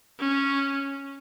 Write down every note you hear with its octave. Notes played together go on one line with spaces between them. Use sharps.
C#4